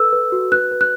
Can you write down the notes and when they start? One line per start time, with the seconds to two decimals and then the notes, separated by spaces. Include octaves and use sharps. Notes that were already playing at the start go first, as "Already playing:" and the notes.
Already playing: A4 B4 E6
0.12 B4
0.32 F#4
0.52 B4 F#6
0.71 B4
0.81 F#6